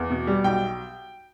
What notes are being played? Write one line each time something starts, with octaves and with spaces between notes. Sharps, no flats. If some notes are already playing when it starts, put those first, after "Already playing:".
Already playing: E2
B2
G3
B1 G5